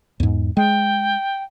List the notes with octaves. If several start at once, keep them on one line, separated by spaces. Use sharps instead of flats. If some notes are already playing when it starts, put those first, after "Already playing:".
E2 G#2
G#3 G5